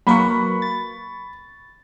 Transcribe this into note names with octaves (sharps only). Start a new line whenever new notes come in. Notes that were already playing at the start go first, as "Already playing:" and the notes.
F#3 A#3 B4 B5 C#6
A6